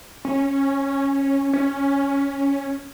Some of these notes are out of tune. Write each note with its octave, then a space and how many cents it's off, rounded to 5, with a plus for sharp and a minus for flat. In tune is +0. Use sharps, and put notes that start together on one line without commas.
C#4 -10
C#4 +5